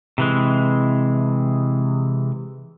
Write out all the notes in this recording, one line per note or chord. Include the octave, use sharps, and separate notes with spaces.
C3 E3 G#3